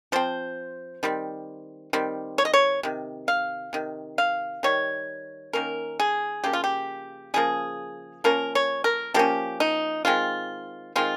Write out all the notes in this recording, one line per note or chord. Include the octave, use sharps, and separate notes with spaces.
F3 C4 C5
D#3 G3 C4
D#3 G3 C4
C#5
D#5
C#5
C3 D#3
F5
C3 D#3
F5
D#3 G3 C#5
D#3 G3 A#3 C#4 A#4
G#4
C#3 F3 A#3 G4
F4
G4
C#3 F3 A#3 G#4
F3 A#3 C#4 A#4
C#5
A#4
F3 A#3 C#4 G4
D#4
D#3 G#3 C4 F4
D#3 G#3 C4 F4